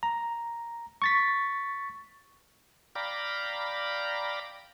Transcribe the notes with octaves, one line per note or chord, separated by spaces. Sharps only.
A#5
C#6 A6 B6
D5 F5 G5 A#5 B5